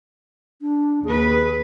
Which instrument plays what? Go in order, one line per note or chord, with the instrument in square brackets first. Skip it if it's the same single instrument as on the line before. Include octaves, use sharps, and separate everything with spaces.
[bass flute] D4
[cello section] D#2 B4 [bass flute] G#4